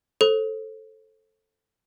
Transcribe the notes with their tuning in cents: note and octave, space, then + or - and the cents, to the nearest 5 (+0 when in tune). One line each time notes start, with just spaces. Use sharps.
A4 +0 C5 +30